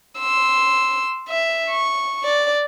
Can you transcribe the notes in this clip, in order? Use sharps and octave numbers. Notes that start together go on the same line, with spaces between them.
C6 E6
E5
C#6
D5